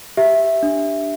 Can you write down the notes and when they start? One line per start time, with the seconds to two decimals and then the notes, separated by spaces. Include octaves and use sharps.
0.17 G4 E5
0.63 D4